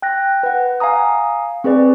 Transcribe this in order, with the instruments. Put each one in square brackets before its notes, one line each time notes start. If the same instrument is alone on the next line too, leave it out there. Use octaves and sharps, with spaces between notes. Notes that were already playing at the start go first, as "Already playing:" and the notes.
[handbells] G5 F#6 A#6
B4 F#5
F5 G#5 A#5 D#6
C4 G#4 B4 D5